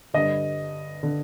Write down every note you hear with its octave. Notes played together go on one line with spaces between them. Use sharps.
G2 D3 D#5
D3